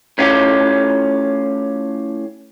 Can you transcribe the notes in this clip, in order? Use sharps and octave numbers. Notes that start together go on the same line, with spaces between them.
A2 C#4 F4 G4